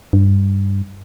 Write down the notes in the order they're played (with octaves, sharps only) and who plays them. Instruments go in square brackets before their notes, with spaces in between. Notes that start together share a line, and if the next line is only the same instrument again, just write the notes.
[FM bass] G2